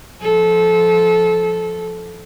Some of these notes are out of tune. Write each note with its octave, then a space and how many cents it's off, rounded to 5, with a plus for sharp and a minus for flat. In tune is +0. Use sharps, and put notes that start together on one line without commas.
F3 +0 A4 -20